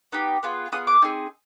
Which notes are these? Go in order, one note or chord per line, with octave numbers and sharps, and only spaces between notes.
B3 D#4 G4
B3 F4 G#4
B3 F4 G#4 D#6
D6
C4 D#4 G#4